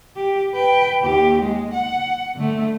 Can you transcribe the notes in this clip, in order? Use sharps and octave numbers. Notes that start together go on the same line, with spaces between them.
G4
B4 G5
D#2 G4
G#3
F#5
D3 A3